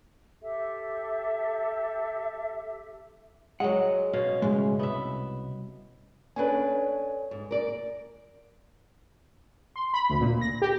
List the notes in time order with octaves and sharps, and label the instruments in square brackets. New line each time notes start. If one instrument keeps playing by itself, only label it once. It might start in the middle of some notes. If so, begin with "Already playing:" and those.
[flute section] G4 A4 E5
[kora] F#3 G#3 [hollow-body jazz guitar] F#5
[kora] B2 C#4 F5
[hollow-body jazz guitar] A2 C#3 G#3
[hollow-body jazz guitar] C2 G#2 [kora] B3 E5
[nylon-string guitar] C#4 D4 B4 [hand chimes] A4 C#5 G#5
[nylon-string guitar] G#2
A#4 D5
[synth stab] C6
B5
D2
A#2
A#6
G4